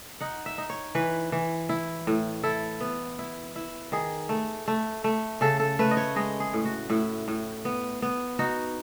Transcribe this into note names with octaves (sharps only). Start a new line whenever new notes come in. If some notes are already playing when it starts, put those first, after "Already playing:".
D#4 F#5
E5
D#4
C#5
E3 B4
E3
E4
A2
E4 A4
B3
E4
E4
D#3 G#4
A3
A3
A3
C#3 A4
A4
A3 B4
D#5
C#5
G#3 D#5
G#4
A2
F#4
A2 E4
A2
B3
B3
D#4 F#4